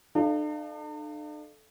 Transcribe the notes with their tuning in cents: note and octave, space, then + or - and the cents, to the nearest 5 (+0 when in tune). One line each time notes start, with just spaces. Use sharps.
D4 +45 A4 -15 F5 -20